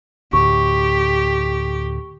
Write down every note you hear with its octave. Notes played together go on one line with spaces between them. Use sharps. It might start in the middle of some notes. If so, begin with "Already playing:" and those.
D2 A2 G4 C#6